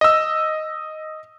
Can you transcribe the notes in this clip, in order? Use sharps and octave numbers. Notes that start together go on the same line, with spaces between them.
D#5 E6